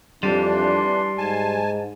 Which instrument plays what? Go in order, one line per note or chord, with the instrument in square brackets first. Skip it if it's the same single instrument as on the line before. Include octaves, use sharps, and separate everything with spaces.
[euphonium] F2 [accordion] E3 D4 [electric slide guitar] G3 [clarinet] C6
[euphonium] G#2 [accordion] G#5 A5